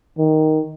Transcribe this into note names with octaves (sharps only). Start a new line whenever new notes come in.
D#3